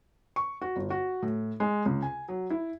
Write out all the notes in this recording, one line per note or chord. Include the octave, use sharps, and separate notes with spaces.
C#6
F#4
G1
F#4
A2
G#3
C#2
G#5
F#3
E4